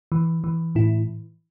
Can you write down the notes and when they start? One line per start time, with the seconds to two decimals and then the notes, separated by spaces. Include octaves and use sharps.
0.12 E3
0.44 E3
0.75 A2 E4